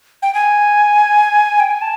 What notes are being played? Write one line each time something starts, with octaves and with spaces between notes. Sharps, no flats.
G5
G#5
G5
G#5
A5